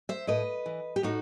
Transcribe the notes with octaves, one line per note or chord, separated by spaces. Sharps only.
C5 E5
A2 B4 D#5
E3
G4
A2 D#4 F#4